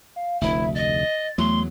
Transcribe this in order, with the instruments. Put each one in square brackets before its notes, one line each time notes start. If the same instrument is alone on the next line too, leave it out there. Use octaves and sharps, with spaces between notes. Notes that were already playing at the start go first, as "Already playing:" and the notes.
[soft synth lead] F5
[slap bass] F1 D2 [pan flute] E4 [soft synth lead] E5
[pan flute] D#5 [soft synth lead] A6
[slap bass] E2 F#3 [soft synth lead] A3 [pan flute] C6